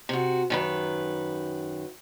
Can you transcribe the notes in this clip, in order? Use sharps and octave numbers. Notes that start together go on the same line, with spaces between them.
C3 F#4
F#2 D#3 B4